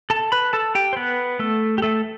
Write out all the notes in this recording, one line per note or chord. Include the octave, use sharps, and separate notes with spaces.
A4 A5
B4 B5
A4 A5
G4 G5
C5
B3 B4
A3 A4
G4
A3 A4